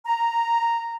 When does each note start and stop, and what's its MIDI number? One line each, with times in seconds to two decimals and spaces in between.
0.05 0.96 82